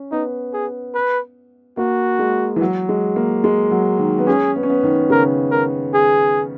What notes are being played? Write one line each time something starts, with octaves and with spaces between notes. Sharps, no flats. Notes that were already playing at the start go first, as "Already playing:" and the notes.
Already playing: C#4
B3 D#4
G#4
B4
A#3 F#4
G#3
E3
F#3
G#3
A#3
G#3
F#3
D#3
B3
C#4 G#4
B3
C#4
B3
D#3
C#3 A#4
A#4
G#4